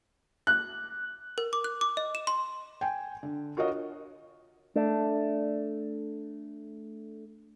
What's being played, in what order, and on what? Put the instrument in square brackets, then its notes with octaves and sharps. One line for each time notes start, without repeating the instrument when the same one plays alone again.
[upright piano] F#6
[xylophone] A#4
D6
F#6
D6
D#5
E7
C6
[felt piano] G5 G#5
D3
F4 F#4 A#4 C#5 D#5
[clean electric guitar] A3 D4